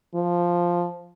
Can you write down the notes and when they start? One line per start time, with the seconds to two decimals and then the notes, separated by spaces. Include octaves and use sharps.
0.14 F3